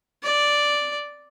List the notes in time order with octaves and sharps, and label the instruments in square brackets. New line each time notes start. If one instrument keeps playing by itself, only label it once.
[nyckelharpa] D5